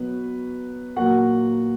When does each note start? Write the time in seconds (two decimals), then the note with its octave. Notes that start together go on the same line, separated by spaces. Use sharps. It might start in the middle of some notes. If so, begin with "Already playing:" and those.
Already playing: B2 F#3 B3 B4
0.96 A#2 F#3 A#3 F#4 F#5